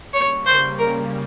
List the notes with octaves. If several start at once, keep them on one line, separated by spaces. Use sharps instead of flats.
C#3 G3 A#3 C#5
C5
A#4